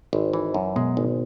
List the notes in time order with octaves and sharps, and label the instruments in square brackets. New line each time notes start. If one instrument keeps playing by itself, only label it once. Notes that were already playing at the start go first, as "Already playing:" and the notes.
[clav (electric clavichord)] G#1
E3
F#2
[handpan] B2 B3 [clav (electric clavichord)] G#3
[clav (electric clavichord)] G#1